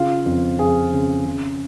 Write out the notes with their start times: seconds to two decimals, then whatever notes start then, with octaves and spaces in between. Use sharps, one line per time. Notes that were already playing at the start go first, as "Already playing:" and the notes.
Already playing: C#3 F4
0.26 F2
0.59 F2 G#4
0.92 C#3
1.25 C#3